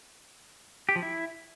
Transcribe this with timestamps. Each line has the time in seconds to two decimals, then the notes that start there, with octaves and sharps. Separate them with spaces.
0.89 G4
0.96 F3
1.03 E4